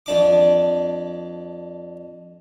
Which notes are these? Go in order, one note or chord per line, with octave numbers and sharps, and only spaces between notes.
F2 D4 D6